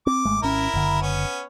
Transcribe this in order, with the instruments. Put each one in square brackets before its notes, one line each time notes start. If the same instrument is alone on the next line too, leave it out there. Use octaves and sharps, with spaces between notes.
[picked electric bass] C4 [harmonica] D6
[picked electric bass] G#1 G#3 A3
[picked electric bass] G#1 C#4 [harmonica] E4 A#4
[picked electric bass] F#1 D3
[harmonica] B3 C#4